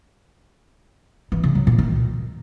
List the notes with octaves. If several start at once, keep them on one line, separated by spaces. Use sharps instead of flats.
E3
C#3
F#3
A#2
D#3